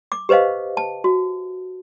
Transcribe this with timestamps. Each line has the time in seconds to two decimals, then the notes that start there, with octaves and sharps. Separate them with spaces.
0.12 D6
0.29 G4 B4 C5 D#5 F5
0.77 A5
1.04 F#4